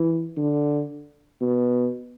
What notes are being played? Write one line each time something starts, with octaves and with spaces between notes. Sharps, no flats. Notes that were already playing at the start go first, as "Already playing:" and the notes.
Already playing: E3
D3
B2